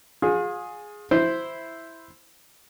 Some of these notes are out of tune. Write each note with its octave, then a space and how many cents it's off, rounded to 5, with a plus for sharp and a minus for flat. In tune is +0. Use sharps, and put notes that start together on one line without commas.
F4 +40 G#4 +0
E4 +0 C5 -5